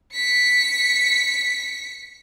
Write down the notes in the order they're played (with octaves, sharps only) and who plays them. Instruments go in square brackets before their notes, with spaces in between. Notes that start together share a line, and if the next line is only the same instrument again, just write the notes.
[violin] B6 C#7